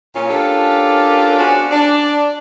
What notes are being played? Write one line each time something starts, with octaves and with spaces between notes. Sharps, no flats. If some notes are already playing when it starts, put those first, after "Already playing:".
A#2 C#4 F4
C#4 D4 F4 G4 A4 A#4
B3 C#4 D4 F#4 G#4 C5
D4 D5